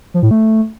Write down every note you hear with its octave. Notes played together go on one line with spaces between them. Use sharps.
F3
A2
A3